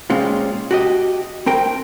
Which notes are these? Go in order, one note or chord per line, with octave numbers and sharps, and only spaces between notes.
A#2 G#3 C4 C#4 F4
F#4 G4 D#5
C4 A#4 G5